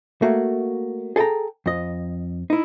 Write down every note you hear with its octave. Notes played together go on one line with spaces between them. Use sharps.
A3 A#3 F#4
G#4 A4 D#5 G5 A#5
F2 D#5
D#4 E4